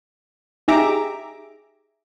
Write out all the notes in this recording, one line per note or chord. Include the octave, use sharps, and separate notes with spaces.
D#4 G4 G#4 E5 A#5 D6